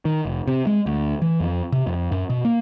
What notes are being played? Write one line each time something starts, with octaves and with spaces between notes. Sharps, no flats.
D#3
F1
C3
G#3
D2
E3
F2
C3
F2
F#2
B2
A#3